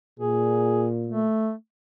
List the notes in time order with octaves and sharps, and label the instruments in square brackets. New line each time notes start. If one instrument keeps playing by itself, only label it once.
[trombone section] A#2 [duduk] G#4
[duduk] A3